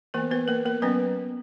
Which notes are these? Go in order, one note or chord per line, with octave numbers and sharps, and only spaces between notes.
E3 A#3 B3 A#4
B3 B4
A#3 A#4
A#3 A#4
F#3 B3 C#4 B4